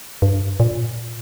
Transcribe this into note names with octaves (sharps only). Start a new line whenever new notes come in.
G2
A#2